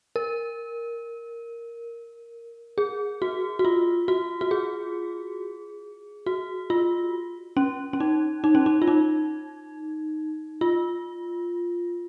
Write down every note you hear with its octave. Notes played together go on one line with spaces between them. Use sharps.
A#4
G#4
F#4
F#4
F4
F#4
F#4
G#4
F#4
F4
C#4
C#4
D#4
D#4
C#4
D#4
F4
D#4
F4